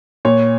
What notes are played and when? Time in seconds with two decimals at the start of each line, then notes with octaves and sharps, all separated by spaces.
0.25 A#2 C#5